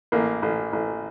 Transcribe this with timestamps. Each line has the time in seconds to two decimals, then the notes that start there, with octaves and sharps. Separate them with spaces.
0.12 A1 A#3
0.42 A1
0.73 A1